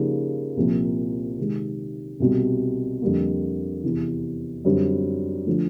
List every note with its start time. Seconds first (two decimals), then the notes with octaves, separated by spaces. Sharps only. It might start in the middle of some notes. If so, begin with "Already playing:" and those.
Already playing: C#3 F3 A#3 D#4 G4
0.57 C2 A#2 F3
1.38 C3 D#3 G#3
2.20 C2 B2 G3
3.02 F2 D3 G3 A#3
3.84 E2 C3 E3
4.64 F#2 D3 G3 C4
5.46 D3 F3 A3